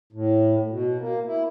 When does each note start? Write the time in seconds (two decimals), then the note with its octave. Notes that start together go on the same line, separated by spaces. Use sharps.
0.13 A2
0.70 B2
1.00 A#3
1.26 E4